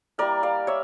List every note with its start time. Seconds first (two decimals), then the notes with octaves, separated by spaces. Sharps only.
0.18 G3 A#3 E4 A#4 D5
0.43 D5 F5
0.67 C#5 E5